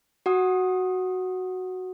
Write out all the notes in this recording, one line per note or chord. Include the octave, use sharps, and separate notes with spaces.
F#4 F#5 D#6